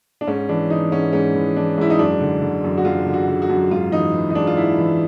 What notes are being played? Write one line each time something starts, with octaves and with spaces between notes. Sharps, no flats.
D4
G#2 C#4
E3 D4
E3 D#4
G#2 C#4
G#2 C#4
E3
E3 D4
G#2 E4
D#4
F#2 D4
D3
D3
F#2
F#4
F#2 F4
D3
F#4
D3
F#4
F#2
G#2 F4
E3 D#4
E3
D#4
G#2 D4
F4
G#2 E4
E3